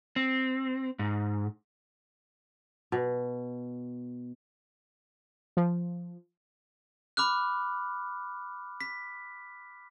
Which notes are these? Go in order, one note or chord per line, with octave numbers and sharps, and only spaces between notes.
C4
G#2
B2
F3
B5 D6 F6 F#6
B6